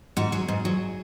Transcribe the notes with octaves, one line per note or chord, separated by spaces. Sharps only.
G#2 F#4
F#3 G#4
G#2
F#3